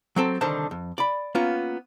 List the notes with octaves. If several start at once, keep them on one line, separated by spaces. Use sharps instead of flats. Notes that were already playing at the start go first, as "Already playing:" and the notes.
F#3 C4 A4
C2 D3 D#3 C5 A5
F2
D5 B5
A#3 B3 C#4 F4